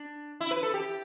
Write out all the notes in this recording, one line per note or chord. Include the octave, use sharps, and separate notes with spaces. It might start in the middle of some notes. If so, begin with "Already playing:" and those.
Already playing: D4
E4
B4
A4
G4